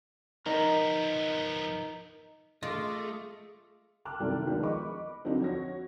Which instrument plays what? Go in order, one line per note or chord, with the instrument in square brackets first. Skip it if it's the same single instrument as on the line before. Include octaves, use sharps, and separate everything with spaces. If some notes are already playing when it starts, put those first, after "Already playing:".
[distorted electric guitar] F3 B3 [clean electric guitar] D#4 A#4
[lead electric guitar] A3 [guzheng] F4 [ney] G#4 [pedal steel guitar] D#5 D6
[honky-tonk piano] G5 A5 D6 F6 F#6
C2 F#2 D#3 A4 D5 G5
D#3 F3 G#3 B3 D4
D#5 B5 C#6 D6
D3 F3 F#3 C4 D4 D#4
F#4 C#5 A#6